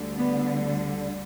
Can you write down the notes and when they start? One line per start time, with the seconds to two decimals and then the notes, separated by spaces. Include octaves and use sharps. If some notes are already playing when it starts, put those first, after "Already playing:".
Already playing: D2 D3 G3
0.15 B3